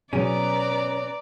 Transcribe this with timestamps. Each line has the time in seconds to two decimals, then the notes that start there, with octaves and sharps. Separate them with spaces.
0.13 B2 F#3 C#4 G#4 B4 D5 A#5